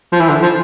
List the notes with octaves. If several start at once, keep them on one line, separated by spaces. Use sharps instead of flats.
F3
E3
D3
F3